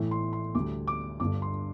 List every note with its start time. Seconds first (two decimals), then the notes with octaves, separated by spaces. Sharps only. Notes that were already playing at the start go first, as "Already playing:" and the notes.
Already playing: A1 A2 E3 A3
0.11 C6
0.33 C6
0.55 D2 D3 G3 D6
0.88 D6
1.20 G1 G2 D3 D6
1.42 C6